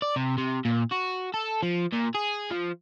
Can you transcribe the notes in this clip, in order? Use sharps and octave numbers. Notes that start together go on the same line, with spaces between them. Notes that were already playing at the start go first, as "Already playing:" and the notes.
D5
C3
C3
A#2
F#4
A4
F3
A#2
G#4
F3